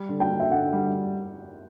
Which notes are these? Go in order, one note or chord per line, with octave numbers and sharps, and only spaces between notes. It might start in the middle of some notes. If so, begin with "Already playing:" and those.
Already playing: G3
D3
G5
D3
E5
D3 F#5
G3